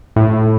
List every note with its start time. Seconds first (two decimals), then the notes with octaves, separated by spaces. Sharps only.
0.16 A2